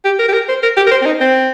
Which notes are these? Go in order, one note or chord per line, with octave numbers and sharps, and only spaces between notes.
G4
A#4
G4
A#4
C5
A#4
G4
A#4
C5
C4
D#4
C4